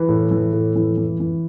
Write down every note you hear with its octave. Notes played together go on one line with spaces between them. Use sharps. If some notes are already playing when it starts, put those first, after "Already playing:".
Already playing: E3 B4
A2
E3
A2
E3
E3
E3